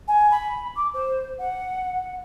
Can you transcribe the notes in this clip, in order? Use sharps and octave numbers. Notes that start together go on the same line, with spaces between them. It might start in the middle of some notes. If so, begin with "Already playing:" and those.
G#5
B5
D6
C5
F#5